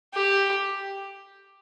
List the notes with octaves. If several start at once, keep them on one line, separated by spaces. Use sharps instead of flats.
G4